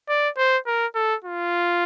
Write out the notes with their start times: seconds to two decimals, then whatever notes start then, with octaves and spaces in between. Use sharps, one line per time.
0.09 D5
0.38 C5
0.67 A#4
0.95 A4
1.25 F4